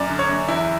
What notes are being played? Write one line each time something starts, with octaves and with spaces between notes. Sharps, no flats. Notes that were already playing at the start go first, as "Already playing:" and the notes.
Already playing: F#2 D5
D3
C#5
F#2
E2 E4